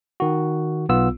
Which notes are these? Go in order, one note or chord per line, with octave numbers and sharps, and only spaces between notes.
D#3 F#4
B1 B3 F4 E6